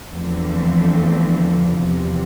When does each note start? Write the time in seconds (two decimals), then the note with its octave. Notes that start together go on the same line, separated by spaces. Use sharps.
0.11 E2 D3 F3 A3 C4
1.75 E2 C3 F3